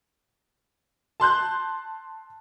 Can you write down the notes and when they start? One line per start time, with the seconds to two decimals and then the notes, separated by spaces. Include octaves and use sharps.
1.20 A5 C6 F#6 G6